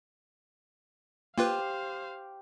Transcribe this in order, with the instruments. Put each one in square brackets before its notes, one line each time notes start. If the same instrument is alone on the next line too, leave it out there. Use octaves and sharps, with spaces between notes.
[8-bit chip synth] A#3 F4 B4 [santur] G4 [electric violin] C5 F5